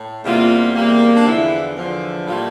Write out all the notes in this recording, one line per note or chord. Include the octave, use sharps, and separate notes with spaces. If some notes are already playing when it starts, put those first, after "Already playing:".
Already playing: A2
E2 C3 G3 A#3 F4
E2 C3 G3 A#3
D4
E2 D3 F3 E4
E2 D3 F3
A2 G3 A#3 F4